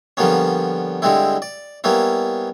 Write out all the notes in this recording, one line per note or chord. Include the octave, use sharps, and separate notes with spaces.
D3 F3 G3 A#3 B3 C#4
D3 G3 G#3 C4 E4
D5
G3 A#3 B3 C#4 E4